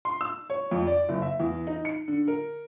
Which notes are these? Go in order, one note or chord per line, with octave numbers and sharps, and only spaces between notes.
C6
E6
C#5
F2
D5
F#1
E5
E2
D#4
C#7
D3
A#4